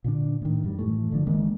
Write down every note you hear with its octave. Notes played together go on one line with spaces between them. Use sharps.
A#2 D3 D4
A2 D#3
F#2 G3
A2 E3 A3
F#1 D3 F3 D4
D#3 G#3 A#3 D4